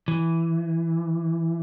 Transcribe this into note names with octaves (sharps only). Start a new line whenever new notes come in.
E3